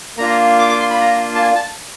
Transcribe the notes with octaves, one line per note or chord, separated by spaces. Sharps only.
A#3 D4 F4 A#5
D6
D6
C6
B5
A#5
A5
G#5
A5